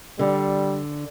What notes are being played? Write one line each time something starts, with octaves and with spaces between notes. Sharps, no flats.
D3 G3